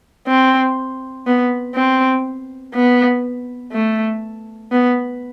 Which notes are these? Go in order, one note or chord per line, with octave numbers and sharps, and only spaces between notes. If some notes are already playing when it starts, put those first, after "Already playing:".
C4
B3
C4
B3
A3
B3